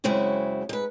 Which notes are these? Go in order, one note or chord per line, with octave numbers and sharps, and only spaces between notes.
F#2 C#3 G#3 C4 E4 F#4
G#2 B4